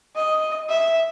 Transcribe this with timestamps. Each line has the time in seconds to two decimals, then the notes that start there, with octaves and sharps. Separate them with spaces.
0.16 D#5
0.69 E5